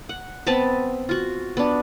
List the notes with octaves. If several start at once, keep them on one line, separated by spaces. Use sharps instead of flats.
F#5
B3 C4 A5
F4 F#4
B3 D4